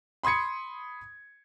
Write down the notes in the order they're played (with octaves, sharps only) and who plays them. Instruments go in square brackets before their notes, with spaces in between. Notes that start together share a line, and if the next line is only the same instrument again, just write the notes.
[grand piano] B5 C6 D#6 G#6 C#7